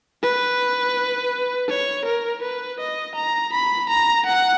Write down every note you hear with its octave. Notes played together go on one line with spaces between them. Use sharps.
B4
C#5
A#4
B4
D#5
A#5
B5
A#5
F#5